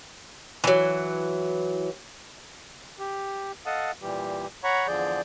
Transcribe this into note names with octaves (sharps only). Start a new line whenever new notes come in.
E3 F#3
G4
A4 D#5 F5 F#5 A5 D#6
A#2 E3 G3 G4
C#5 F#5 A#5 B5 C#6
E2 D3 F3 G#4 D5 G6